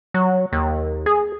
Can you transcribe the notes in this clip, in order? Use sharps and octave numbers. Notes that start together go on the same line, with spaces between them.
F#3
D#2
G#4